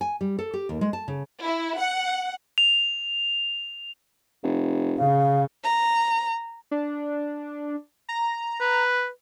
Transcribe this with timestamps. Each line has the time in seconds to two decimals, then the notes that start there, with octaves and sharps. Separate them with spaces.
0.01 G#5
0.21 G3
0.39 A4
0.54 G4
0.69 D#2
0.81 G#3
0.93 A5
1.08 C#3
1.44 E4
1.78 F#5
2.58 F7
4.43 F1
4.99 C#3 F5
5.64 A#5
6.71 D4
8.09 A#5
8.61 B4